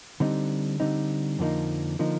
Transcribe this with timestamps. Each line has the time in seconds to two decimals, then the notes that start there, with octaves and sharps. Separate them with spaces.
0.20 D3 G3 C4 D#4
0.80 D3 G3 C4 D#4
1.39 F2 D3 F3 A#3 D#4
1.99 D3 F3 A#3 D#4